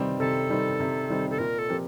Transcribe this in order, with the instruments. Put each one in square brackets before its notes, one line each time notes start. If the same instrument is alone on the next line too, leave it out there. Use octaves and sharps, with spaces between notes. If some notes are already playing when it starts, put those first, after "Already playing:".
Already playing: [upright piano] C3 D#3 G3 C4 D#4
[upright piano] C3 [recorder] A4
[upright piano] D#3 G3 C4 D#4
C3
D#3 G3 C4 D#4
[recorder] A4
[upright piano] A#2 [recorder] A#4
[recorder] A4
[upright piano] F3 C4 G4 A#4